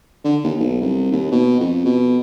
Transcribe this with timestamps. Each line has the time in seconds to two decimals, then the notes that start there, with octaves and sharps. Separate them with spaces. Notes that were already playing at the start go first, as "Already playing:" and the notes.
0.24 D3
0.44 D#2
0.59 B1
0.81 C2
1.12 D#2
1.31 B2
1.60 F2
1.85 B2